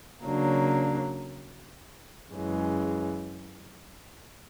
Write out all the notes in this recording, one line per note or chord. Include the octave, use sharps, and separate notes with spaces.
C#3 F#3 A#3 D4
F#2 C#3 E3 G#3